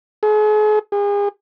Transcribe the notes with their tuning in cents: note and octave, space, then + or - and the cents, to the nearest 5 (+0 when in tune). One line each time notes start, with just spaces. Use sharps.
G#4 +40
G#4 -40